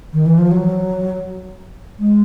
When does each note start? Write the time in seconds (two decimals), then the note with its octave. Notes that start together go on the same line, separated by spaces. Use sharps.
0.13 D#3
0.25 E3
0.37 F3
0.51 F#3
1.99 G#3